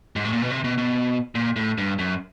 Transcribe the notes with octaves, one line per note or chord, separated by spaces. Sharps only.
G#2
A2
A#2
B2
C3
B2
B2
A#2
A2
G2
F#2